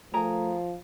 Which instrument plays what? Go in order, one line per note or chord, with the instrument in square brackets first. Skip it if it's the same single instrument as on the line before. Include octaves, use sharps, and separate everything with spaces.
[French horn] F3 [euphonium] A3 [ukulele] G#4 A#4 A#5